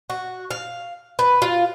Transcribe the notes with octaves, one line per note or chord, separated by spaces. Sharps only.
F#4
F5
B4
F4